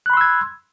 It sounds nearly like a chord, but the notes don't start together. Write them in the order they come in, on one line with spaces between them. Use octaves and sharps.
F#6 B5 C6 E6 G#6